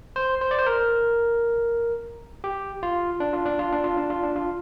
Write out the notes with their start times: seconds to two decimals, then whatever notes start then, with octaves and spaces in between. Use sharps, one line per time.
0.16 C5
0.41 C5
0.51 D5
0.59 C5
0.66 A#4
2.44 G4
2.83 F4
3.20 D4
3.33 F4
3.46 D4
3.59 F4
3.72 D4
3.84 F4
3.97 D4
4.10 F4
4.23 D4
4.36 F4